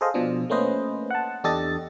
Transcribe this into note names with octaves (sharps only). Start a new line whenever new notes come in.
G#4 A4 C5 D#5 F5
B2 F3 D4
A3 A#3 C#4 B4 C5 D#5
F#5 A5
E2 D4 G4 A4 D#5 A6